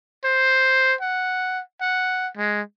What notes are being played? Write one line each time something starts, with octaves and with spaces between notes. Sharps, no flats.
C5
F#5
F#5
G#3